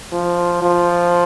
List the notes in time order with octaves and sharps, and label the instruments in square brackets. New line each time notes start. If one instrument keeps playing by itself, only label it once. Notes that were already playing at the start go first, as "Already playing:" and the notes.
[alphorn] F3
F3